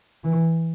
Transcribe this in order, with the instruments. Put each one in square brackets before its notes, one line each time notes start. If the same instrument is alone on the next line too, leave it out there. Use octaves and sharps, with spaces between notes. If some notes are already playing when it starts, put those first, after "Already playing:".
[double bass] E3